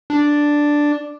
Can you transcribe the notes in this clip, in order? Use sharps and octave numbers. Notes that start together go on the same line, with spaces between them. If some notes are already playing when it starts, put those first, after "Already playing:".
D4